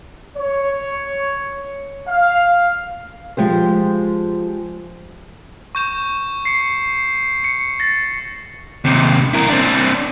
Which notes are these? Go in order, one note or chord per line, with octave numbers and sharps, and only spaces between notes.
C#5
F5
F3 G#3 G4 C5
C#6 G6 E7
C7 C#7
C#7
A6 A#6
D#2 C3
E4 A#4
C4 D4